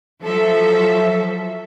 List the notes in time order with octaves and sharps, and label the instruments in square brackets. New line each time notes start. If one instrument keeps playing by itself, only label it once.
[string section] F3 F#3 A4 E5